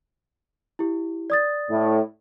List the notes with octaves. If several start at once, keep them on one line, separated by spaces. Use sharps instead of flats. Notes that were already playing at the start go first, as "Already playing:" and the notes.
E4 G4
D5 D#6 A6
A2